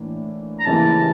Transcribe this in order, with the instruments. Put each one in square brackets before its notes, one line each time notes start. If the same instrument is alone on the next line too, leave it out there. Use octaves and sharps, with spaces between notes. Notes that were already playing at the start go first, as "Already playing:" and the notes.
Already playing: [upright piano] A2 E3 A#3 D4
[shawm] A#5
[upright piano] C#3 E3 A#3 E4 G4 [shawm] A5